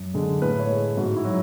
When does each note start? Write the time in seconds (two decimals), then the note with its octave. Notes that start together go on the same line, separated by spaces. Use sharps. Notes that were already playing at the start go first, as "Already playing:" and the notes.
Already playing: F#2
0.14 D3 G#3
0.42 A2 B4
0.60 C#5
0.69 G#3
0.97 G#2 F#4
1.16 E4
1.25 F#3